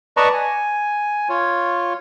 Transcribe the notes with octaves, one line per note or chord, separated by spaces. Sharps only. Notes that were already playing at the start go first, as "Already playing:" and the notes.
B4 D5 D#5 A5 A#5 C#6
G#5
F4 C#5